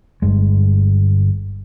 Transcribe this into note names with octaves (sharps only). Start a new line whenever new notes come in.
G1 G2 G#3